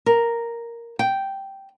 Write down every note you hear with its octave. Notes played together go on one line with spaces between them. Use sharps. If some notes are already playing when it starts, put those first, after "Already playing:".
A#4
G5